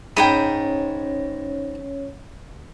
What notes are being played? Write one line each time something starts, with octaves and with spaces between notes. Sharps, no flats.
G#2 C#4 C#5 G5 A#5 B5 D#6